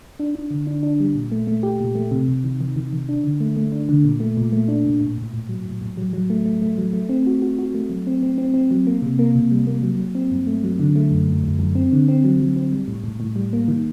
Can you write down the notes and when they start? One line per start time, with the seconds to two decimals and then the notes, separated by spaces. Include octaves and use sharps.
0.20 D4
0.35 D4
0.51 D3
0.67 D4
0.83 D4
1.00 G3
1.15 A#2
1.32 A3
1.47 A3
1.63 G4
1.80 A#2
1.95 A3
2.11 C3
2.28 C3
2.44 D#3
2.61 D#3
2.76 D#3
2.93 D#3
3.09 D4
3.24 D3
3.40 A3
3.57 A3
3.72 D4
3.89 D3
4.05 A#2
4.20 A3
4.37 A#2
4.53 A3
4.68 D4
4.86 A#2
5.01 A2
5.18 A2
5.33 A2
5.49 F#3
5.66 A2
5.81 A2
5.97 F#3
6.13 F#3
6.30 A3
6.45 A3
6.62 A3
6.78 F#3
6.93 A3
7.09 C4
7.26 F#4
7.42 F#4
7.58 F#4
7.74 A3
7.90 F#3
8.07 C4
8.23 C4
8.38 C4
8.54 C4
8.71 F#3
8.87 A#3
9.02 C3
9.19 A#3
9.35 C3
9.51 G3
9.67 A#3
9.82 F#3
10.00 F#3
10.15 C4
10.31 G2
10.47 A3
10.64 F#3
10.80 D3
10.96 A3
11.11 F#2
11.28 F#2
11.44 F#2
11.59 F#2
11.75 C4
11.92 D3
12.08 C4
12.24 F#3
12.40 F#3
12.56 C4
12.72 G3
12.88 A2
13.04 A2
13.20 A2
13.36 G3
13.53 A#3
13.68 D#3